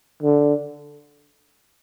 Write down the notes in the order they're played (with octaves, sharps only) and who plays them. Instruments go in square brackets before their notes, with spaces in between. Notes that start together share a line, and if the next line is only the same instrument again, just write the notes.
[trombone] D3